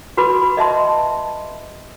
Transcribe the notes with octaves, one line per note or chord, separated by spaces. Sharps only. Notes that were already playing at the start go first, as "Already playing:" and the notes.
F#4 B4 B5 D6
D#5 E5 A5 C6